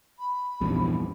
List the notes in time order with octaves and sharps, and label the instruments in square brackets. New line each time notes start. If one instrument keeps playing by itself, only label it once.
[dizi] B5
[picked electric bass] A#1 E2 G2